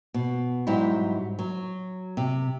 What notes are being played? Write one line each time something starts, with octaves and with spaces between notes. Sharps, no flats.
B2
G#2 F#3 G3 E4
F#3
C3